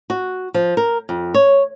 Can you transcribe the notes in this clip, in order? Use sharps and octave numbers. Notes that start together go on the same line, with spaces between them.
F#4
F3
A#4
F2
C#5